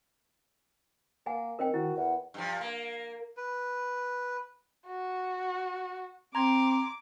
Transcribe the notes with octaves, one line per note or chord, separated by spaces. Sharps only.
A#3 F#5 G#5
D#3 C4 A#4 C5 G5
D#3 E4 F#4
E2 F#5
G2 F3
A#3
B4
F#4
C4 A#5 C6 D6 G#6